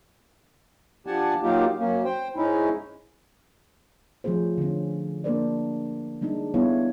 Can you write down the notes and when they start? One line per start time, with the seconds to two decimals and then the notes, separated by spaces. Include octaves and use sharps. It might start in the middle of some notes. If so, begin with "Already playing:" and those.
1.07 F3 D4 G4 F#5 G#5 A5
1.43 F#3 A#3 D#4 F4 G4
1.79 F#2 A#3 C#4
2.05 C5 G5
2.36 G#2 G#3 C#4 D#4 E4
4.24 F3 A3 C#4 G#4 C5
4.58 D3 C#4
5.24 A#3 D4 A#4 C5 D5
6.21 G3 G#3 D4 D#4
6.54 G3 B3 E4 C#5 F5